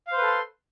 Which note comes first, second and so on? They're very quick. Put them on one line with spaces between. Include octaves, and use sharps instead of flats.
F5 C5 B4 A4 C6